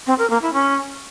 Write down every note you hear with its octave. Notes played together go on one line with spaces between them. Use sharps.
C4
A#4
A#3
E4
C#4